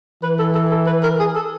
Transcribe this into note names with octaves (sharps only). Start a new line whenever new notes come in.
E3 B4
A4
A4
A4
B4
A#4
G#4
A4